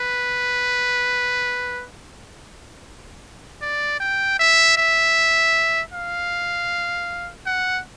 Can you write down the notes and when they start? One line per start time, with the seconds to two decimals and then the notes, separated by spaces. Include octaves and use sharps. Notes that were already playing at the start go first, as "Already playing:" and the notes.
Already playing: B4
3.62 D5
4.00 G5
4.40 E5
4.78 E5
5.93 F5
7.46 F#5